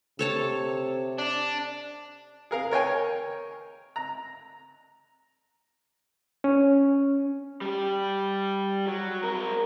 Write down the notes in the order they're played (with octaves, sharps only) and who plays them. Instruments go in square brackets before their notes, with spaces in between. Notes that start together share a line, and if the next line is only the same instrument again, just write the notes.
[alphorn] C3 [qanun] A4 C#5 A5
[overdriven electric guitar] D4
[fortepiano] G#4 A#4 F5
A#4 C#5 G5 G#5
A#5
[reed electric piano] C#4
[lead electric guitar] G3 G4
F#3
C4 A#4